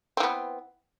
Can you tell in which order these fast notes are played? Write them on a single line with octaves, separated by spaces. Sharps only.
C4 E3 B3